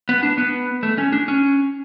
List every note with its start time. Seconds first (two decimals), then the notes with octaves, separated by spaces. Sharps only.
0.09 B3
0.23 D4
0.38 B3
0.83 A3
0.98 C#4
1.13 D4
1.28 C#4